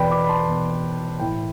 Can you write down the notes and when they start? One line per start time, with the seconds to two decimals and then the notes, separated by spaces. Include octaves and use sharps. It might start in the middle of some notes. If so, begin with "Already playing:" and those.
Already playing: E2 B2 B4 D5 G5 B5
0.10 B5 D6
0.24 B5
0.28 A5 C6
0.47 E2 B2
1.19 A2 E3 G5 B5